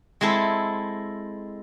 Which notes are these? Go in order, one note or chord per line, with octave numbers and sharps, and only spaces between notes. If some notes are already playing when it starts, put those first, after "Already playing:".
G#3 C4 E4 A4